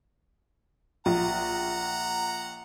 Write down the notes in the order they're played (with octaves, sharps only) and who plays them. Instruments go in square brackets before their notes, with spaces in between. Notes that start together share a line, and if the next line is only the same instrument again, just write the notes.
[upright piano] A#1 [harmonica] F#5 A#5